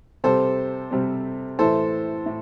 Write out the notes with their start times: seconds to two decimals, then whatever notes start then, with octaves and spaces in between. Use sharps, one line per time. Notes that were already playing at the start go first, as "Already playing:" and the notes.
0.24 C3 G3 C4 A4 C5
0.91 C3 G3 C4
1.59 A2 E3 A3 E4 A4 C5
2.26 A2